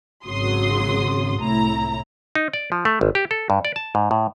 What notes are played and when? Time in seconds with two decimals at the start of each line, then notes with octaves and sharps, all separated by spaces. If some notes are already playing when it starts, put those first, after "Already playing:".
0.25 G#1 C#3 F#3 C6 D#6
1.38 C2 A2 E4 A#5
2.35 D#4
2.53 D5
2.72 F3
2.85 A3
3.01 G#1
3.15 G4
3.31 A4
3.50 G2
3.65 D5
3.76 A5
3.95 G#2
4.11 A2